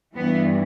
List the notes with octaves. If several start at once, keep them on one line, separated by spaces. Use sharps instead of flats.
G2 E3 B3